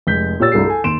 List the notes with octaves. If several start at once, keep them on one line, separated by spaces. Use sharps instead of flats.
F1 G#3 G6 B6
A#2 G4 C#5 E6 A6
C2 G2 A3 F#4 G#4 C7
A4 G#5
D#2 C6 D7 E7